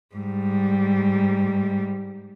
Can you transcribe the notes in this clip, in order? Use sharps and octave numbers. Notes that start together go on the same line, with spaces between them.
G#2 G3